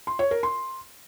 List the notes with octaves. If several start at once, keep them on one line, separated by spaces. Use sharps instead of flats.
C6
C#5
A#4
C6